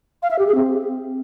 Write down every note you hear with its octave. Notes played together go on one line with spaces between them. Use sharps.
F5
E5
G4
G#4
C4